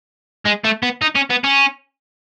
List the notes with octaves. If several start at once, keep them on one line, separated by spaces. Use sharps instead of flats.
G#3
A3
B3
D#4
C#4
B3
C#4